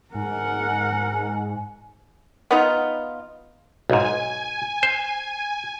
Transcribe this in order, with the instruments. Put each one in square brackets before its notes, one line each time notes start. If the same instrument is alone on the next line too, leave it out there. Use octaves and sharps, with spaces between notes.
[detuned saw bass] G#2 [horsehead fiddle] A#4 F#5 [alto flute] G#5
[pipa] B3 D#4 F4
[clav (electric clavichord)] B1 G#2 [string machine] G#5
[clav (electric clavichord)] C5